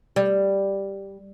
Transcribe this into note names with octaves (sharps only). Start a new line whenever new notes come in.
G3